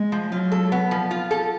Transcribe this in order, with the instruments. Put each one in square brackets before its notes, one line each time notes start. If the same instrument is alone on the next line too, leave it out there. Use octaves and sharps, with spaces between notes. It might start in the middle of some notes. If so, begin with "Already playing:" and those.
Already playing: [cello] G#3
[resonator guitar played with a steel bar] F3
[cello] F#3 [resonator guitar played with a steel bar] F4
[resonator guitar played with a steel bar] A4
B3
F3
F4
A4